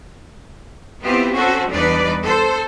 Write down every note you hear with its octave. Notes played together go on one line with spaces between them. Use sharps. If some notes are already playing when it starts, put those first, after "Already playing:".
B3 C4 E4 F4 G4
C4 C#4 F#4 A4 C5
E2 G3 D4 D#4 B4 D5
A4 C5